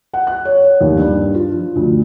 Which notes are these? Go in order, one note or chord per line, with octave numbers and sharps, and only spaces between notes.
F#5
F#6
C#5
C#5
D#2
G2
F4
F3
D2